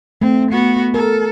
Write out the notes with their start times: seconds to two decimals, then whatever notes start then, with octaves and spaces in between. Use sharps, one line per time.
0.22 A3 C4
0.52 B3 F#4
0.94 A4 A#4